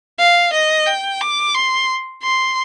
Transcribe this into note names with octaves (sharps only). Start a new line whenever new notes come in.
F5
D#5
G5
D6
C6
C6